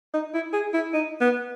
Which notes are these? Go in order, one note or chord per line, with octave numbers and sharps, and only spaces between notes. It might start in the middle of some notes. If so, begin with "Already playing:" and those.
D#4
E4
G#4
E4
D#4
B3